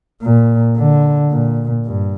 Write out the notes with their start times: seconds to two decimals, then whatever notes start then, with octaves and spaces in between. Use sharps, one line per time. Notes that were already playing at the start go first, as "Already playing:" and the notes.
0.22 A#2
0.77 D3
1.31 A#2
1.86 G2